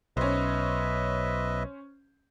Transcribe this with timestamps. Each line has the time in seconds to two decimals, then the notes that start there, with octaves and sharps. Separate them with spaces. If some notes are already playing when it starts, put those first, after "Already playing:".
0.17 B1 C#4 B4 C5 D#5 E5